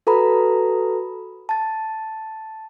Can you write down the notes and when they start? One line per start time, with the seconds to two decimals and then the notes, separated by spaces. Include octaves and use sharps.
0.07 F#4 A4 B4 A#5 B5
1.49 A5 A6